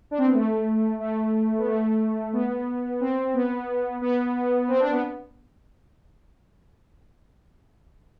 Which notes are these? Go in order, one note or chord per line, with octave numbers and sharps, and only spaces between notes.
D4
C4
B3
A3
A3
B3
A3
B3
C4
B3
B3
C4
D4
B3